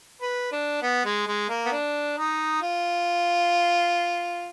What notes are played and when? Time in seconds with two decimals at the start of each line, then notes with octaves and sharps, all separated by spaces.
0.22 B4
0.52 D4
0.82 B3
1.05 G#3
1.27 G#3
1.49 A#3
1.66 B3
1.72 D4
2.17 D#4
2.62 F4